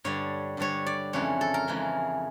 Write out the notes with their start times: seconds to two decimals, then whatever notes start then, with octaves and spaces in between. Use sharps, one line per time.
0.04 G2 D3 G3 C#5
0.57 G2 D3 G3 C#5
0.86 D5
1.13 F2 C#3 E3 G#3 C#5
1.41 A4
1.54 A#4
1.68 F2 C#3 E3 G#3